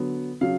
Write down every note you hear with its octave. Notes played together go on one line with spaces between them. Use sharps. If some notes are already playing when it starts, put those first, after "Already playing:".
Already playing: D3 F#3 B3
C#3 F#3 F5